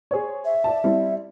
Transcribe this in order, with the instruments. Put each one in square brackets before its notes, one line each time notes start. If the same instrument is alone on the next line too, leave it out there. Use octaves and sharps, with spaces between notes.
[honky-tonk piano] G#4 C5 C#5
[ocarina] E5
[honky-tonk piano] D5 A5
G3 C4 E4